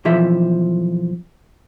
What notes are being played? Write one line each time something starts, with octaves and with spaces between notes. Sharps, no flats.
B1 E3 F3 G4 E5